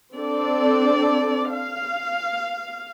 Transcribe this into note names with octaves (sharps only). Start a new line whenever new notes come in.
C4 D4 A4 D5
F5